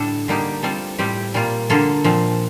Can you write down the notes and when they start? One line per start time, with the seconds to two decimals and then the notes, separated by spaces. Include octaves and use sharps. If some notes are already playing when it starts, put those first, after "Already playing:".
Already playing: A2 D3 G3 D4 A4
0.28 D3 G3 A#3 D#4 G4
0.63 G3 C4 F4 A4
0.99 A2 G3 C4 G4
1.34 A#2 G3 A#3 F4
1.70 D3 G3 A#3 F4 A4
2.04 A#2 F3 C4